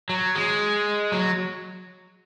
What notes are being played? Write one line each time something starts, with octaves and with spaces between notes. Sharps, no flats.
F#3
G#3
F#3